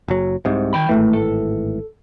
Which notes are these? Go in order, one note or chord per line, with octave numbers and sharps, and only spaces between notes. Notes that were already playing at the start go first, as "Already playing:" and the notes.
F#1 F#3
C2 G#2 C3
D#3 G5 B5
G#1 A2 E3 A3
A4